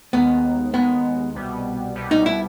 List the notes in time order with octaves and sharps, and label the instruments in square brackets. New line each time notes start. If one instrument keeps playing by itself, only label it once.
[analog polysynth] D#2 D#3 G#3 [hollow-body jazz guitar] B3
[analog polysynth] D#2 D#3 G#3 [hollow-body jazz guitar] B3
[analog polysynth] C2 B2 G3 B3
C2 B2 G3 B3
[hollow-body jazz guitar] D#4
E4